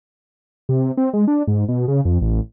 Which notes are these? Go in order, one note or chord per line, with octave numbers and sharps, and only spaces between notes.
C3
C4
G#3
D4
G#2
B2
C#3
F2
A1